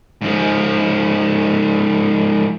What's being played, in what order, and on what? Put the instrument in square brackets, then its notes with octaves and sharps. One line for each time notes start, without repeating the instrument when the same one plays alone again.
[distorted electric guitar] G#2 F3